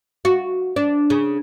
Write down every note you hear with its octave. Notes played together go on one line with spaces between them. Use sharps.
F#4
D4
C#3